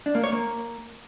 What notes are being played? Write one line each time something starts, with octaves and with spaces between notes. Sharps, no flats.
D4
A#3
C#5
A#3